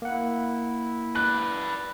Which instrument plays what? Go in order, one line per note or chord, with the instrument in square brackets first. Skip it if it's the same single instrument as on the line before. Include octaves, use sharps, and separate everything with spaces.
[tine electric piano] A#3 F#5 [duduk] E4
[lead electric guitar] B4 D5 [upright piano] F#6